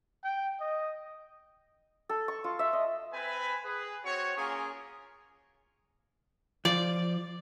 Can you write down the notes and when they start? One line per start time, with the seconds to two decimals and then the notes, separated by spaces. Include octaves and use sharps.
0.24 G5
0.60 D#5
2.09 A4
2.28 C#6
2.44 F4
2.59 E5
2.73 D#5
3.12 C4 B4 G#5 B5
3.62 G#4 B4
4.03 C4 F#4 C#5
4.36 A#3 C#4 F4 G#4 A#4
6.65 F3 D5